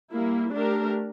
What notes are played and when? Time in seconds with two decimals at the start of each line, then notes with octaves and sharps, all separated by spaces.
0.12 G3 A#3 E4
0.53 A3 D4 G4 A#4